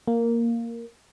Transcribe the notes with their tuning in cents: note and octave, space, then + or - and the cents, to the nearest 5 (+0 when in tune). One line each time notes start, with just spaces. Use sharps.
A#3 -5